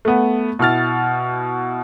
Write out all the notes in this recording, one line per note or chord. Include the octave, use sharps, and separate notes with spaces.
A3 B3
B2 E4 F6 A6